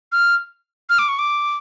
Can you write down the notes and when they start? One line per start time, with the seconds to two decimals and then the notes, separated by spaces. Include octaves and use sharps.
0.12 F6
0.90 F6
0.99 D6
1.08 C#6
1.19 D6